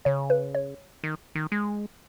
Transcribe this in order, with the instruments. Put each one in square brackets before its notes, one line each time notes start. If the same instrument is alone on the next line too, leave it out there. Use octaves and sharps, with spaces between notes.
[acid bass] C#3 [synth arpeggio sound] C#5
[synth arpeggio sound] B4
C#5
[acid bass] D#3
D#3
G#3